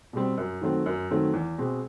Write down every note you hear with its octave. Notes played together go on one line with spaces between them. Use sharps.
B2 G3 C4
F#2
D#3 F#3 A3 C4
F#2
D#3 F#3 A3 C4
E2
B2 G#3 C4